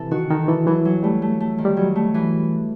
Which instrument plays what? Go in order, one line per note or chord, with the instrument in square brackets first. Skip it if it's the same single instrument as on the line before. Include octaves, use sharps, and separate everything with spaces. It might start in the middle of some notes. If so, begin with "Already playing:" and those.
Already playing: [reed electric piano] C3 E3 [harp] E4 A4
[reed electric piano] D#3 [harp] F#4
[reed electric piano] D#3 [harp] A4
[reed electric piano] E3 [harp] A4
[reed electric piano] E3 [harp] F#3
[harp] F#3
[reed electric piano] G3 [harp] A3
[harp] A3
A3
D#3
[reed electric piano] G3
[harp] F#3
A3
E3